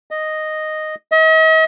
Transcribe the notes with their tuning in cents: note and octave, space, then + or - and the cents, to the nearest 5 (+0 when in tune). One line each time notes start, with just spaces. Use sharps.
D#5 -5
D#5 +45